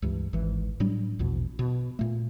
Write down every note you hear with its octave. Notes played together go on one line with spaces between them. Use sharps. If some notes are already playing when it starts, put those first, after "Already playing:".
C#2 G2 E3
G#1 E3
A2 F#3 G3 D4
A#1 E2 B2
B2
A#2 A3